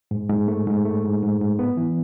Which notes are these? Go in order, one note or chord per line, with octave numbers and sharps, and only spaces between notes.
G#2
G#2
A3
G#2
A3
G#2
G#2
G#2
B3
E3